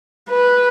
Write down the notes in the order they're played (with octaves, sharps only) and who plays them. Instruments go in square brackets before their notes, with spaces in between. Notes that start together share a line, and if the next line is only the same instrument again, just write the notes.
[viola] B4